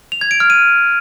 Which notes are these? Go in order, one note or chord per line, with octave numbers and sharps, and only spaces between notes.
F7
G#6
D7
F6
D#7